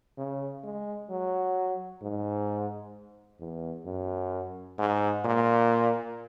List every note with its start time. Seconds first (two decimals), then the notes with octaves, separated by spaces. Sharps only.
0.18 C#3
0.64 G#3
1.10 F#3
2.02 G#2
3.40 E2
3.85 F#2
4.78 G#2
5.25 A#2